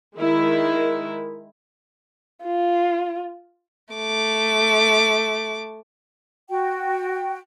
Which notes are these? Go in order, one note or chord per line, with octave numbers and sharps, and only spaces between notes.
D#3 G#3 E4
F4
A3 D6
F#4 G5